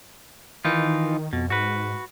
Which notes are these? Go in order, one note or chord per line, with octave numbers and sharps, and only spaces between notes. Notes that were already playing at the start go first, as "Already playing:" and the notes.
D#3 E3 D#4 F4
F2 B2
G#2 F#4 B4